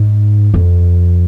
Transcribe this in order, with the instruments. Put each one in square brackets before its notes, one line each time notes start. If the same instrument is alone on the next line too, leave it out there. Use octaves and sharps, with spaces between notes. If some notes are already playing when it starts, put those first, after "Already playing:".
Already playing: [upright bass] G#2
F2